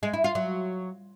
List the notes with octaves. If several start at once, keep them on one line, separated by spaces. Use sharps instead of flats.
G#3
E4
F4
F#3